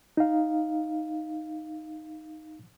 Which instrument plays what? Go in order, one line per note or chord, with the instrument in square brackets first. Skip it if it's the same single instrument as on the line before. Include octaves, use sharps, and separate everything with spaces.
[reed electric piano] D#4 F5